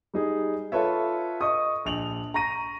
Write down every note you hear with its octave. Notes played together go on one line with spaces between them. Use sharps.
G3 D#4 G#4
F4 A4 B4 C#5 E5
D#5 C#6 D#6
A#1 F7 F#7
A#5 C#6 A#6 D#7